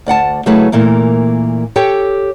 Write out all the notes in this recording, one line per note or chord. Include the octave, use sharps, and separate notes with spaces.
D2 D5 F#5 A5
C#3 F#3 A3 E4 G#4 B4
A#2 E3 A3 A#3
G4 A4 C#5 G5